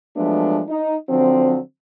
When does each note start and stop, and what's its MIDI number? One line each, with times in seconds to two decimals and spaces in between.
0.17 0.62 53
0.17 0.62 54
0.17 0.62 56
0.17 0.62 57
0.17 0.62 59
0.17 0.62 62
0.69 0.96 63
1.09 1.58 50
1.09 1.58 53
1.09 1.58 54
1.09 1.58 60